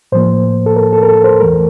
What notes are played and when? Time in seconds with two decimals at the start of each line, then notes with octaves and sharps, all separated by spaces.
0.12 A2 F3 A#3 C5
0.66 A4
0.76 A#4
0.93 A4
1.03 A#4
1.09 A4
1.24 C5
1.41 E2 E3 A3 A#4